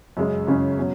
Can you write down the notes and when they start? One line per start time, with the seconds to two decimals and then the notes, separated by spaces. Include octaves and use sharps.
0.17 F#2 C#3 G#3 C#4
0.47 F#2 C#3 G#3 C#4
0.78 B2 F#3 C#4